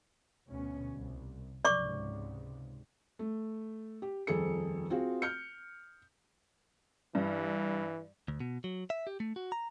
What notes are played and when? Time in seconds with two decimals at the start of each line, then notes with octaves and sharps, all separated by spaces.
0.46 D2 B2 C#4
0.91 C2
1.65 C#2 G#2 C3 D5 C#6 D6
3.19 A3
4.02 G4
4.27 D#1 F2 G#4 A4 C#7
4.90 C4 F4 F#4 G#4
5.22 F6 G6 C#7
7.15 G2 E3
8.28 D2
8.40 B2
8.64 F#3
8.90 E5
9.07 G4
9.20 A3
9.36 F#4
9.52 A#5